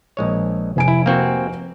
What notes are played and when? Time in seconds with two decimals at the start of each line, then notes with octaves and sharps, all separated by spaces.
0.17 A#1 G#3 C#5
0.76 F1 G#5 D7
0.88 E4
1.06 A#3 C4 F#4